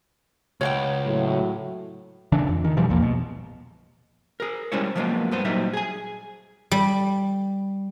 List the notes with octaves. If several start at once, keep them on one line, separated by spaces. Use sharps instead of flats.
C#2 C#5 F#5 G5
A2 F#3
C#3 E3 D4
F2
D#3
B2 E3 F3 G3
A#1 E2 F3 A#3
B2
G#4 A#4
G3 G#3 C#4 E4 C5 C#5
F3 F#3 G#3 A#3 B3 F4
G2 B3 C5
A#2 F#3 G3 D#4 C5 E5
G#4 G#5
G3